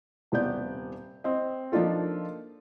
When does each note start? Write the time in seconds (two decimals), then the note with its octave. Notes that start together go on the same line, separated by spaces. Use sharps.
0.32 D#1 C3 B3 D5 G6
1.24 C4 D#5
1.72 F3 A#3 D4 D#4 F4 A4